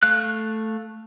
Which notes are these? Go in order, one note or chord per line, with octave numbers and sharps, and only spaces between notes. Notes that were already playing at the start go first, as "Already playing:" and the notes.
A3 F5 F#6